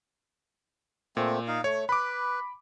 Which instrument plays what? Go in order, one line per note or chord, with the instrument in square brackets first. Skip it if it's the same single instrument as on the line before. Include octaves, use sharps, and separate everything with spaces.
[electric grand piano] A#2 [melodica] A3 C4
[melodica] D#4 F5
[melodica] A3 [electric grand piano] C#5
[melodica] B4 [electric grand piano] B5 D6